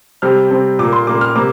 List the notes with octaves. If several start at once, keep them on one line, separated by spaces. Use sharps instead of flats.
C3 G3 C4 F6
C3 G3 C4
A#2 A#3 D6
C6
A#2 A#3 D6
F6
C3 A#3 D6